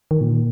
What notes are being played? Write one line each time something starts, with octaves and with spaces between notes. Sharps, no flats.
D#3
A#2